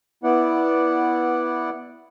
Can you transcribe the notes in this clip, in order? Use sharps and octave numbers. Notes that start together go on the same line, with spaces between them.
B3 E4 D5 F#5